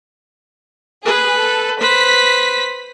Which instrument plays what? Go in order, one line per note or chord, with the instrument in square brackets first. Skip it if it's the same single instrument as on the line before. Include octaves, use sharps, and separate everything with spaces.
[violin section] G#4 [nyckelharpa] B4
[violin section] A4
[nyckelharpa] B4 C5 [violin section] B6